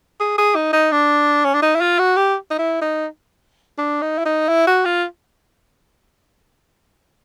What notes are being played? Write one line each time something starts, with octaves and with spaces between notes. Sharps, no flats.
G#4
G#4
D#4
D#4
D4
C#4
D4
D#4
E4
F4
F#4
G4
D#4
E4
D#4
D4
D#4
E4
D#4
E4
F#4
F4